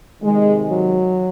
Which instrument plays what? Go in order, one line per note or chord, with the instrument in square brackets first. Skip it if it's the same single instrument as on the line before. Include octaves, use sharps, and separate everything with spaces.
[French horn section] C3 D#3 G#3
F#3